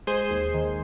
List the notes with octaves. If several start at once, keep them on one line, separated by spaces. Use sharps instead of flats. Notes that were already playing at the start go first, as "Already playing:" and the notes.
G#3 G#4 C5
D#2
D#3